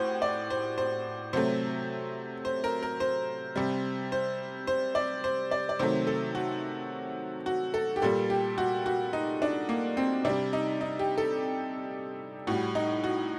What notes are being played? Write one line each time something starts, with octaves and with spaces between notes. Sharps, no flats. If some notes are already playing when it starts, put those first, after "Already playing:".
Already playing: A2 F#4 G4 C5
D5
C5
C5
C3 F#3 A3 C5
C5
A#4
A#4
C5
C3 G3
C5
C5
D5
C5
D5
D5
C3 D#3 F#3 A3 C5
A4
F#4
F#4
A4
G4
A#2 G3 A4
G4
F#4
F#4
D#4
D4
A#3
C4
C3 G3 D4
D#4
D#4
G4
A4
A2 G3 F#4
D#4
F#4